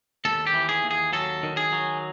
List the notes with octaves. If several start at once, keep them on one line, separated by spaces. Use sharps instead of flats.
D#2 A4
G4
E3
G#4
D#2
G#4
F#3 A4
D#3
G#4
F#3